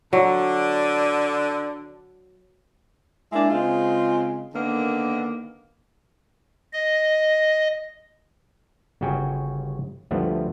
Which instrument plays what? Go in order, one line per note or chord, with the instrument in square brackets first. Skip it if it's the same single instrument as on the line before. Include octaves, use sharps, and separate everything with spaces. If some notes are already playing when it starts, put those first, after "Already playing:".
[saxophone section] D3 [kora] F#3
[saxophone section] G#3 A#3 D4 E4
C#3 G#3 C4 F4
D3 D#3 A#3 B3
[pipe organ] D#5
[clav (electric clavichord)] G1 C#3 F#4 G5 G#5
D2 G2 F3 A3 B3